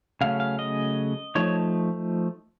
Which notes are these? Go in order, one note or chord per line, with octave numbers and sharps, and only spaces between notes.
C#3 F#3 A3 C#4 F5
F5
D#5
F3 A3 D#4 C#5